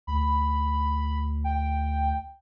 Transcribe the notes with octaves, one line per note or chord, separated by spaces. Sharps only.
D2 B5
G5